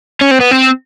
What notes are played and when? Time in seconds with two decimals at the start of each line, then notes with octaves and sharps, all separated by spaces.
0.21 C#4
0.31 C4
0.40 B3
0.51 C4